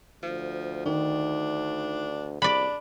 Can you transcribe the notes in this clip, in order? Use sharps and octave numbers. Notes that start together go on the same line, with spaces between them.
D2 F3
D#3 D4
C2 D4 D5 B5